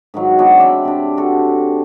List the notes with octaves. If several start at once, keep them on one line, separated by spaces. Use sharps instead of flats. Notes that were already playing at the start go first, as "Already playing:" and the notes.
G#2 D#3 F#3 F5
F#3 B3 D4
C4 D5 E5 G5
C3 D4
F#4 A4